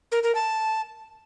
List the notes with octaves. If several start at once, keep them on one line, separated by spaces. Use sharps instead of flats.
A#4
A#4
A5